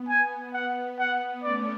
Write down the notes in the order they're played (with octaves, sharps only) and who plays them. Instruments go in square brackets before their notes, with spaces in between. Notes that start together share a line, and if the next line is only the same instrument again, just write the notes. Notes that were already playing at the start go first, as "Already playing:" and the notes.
Already playing: [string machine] B3
[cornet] G#5
F#5
F#5
[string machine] A3 C#4 [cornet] D5